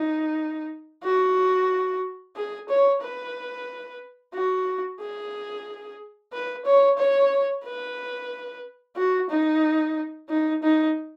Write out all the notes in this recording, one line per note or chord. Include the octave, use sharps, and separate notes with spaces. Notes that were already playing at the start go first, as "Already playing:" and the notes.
Already playing: D#4
F#4
G#4
C#5
B4
F#4
G#4
B4
C#5
C#5
B4
F#4
D#4
D#4
D#4